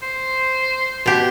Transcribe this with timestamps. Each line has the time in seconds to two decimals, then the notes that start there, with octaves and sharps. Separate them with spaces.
0.03 C5
1.06 B2 G4